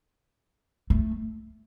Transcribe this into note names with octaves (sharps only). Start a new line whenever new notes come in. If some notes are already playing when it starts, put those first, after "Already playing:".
A3